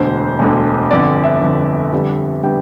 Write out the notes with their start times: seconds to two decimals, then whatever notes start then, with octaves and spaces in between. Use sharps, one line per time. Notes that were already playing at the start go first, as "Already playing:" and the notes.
Already playing: E1 D2 D3 C5
0.39 E1 D2 D3
0.90 G1 F2 D3 D5
1.24 E5
1.41 G1 F2 D3
1.92 F2 D3 G3 B3 D4
2.43 D3 G3 B3 D4 G5